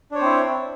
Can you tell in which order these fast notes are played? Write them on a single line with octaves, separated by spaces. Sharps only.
D4 C#5 C5 C4 E4